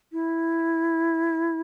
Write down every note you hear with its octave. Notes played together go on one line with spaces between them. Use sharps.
E4